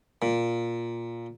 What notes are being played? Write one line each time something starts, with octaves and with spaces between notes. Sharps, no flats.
A#2